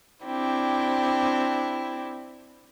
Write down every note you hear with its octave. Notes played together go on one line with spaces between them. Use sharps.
C4 D4 E4 G4